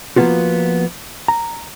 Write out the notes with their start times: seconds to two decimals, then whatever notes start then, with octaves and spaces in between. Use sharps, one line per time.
0.16 F3 G3 A#3 B3 F4 F#4
1.28 A#5